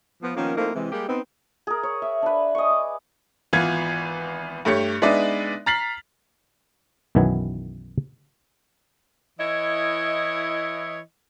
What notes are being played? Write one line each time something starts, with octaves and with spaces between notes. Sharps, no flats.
F3 B3
D#3 F3 A#3 B3 C#4
F3 A3 A#3 C4 D#4 E4
C3 E3 G#3
G3 G#3 A#3 G4 G#4
B3 C4 D#4
G#4 A#4
C#5
E5
D4 B4
D#5 G#5 C#6
D6
G#1 E3 B3 F4 G#6
G2 A3 G4 C#5 C#7
G#3 B3 D4 D#4 D5 E5
A#5 F6 A6 B6 C7 F#7
B1 F#2 D#3 E3 B3 G#5
E3 E4 C#5 D#5